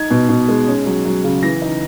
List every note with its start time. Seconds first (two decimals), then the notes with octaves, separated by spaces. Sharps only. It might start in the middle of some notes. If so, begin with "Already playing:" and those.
Already playing: D#4 G#6
0.11 B2
0.29 B2
0.48 G#3
0.67 C#4
0.86 F#3
1.05 F#3
1.24 C#3
1.43 E3 A#6
1.62 D#4